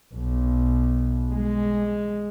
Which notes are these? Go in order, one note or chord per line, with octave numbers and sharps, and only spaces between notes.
B1
G#3